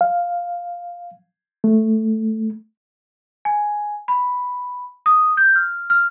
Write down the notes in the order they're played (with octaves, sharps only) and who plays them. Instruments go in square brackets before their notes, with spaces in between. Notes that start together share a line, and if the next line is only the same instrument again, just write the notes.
[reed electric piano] F5
A3
[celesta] G#5
B5
D#6
G6
F6
F6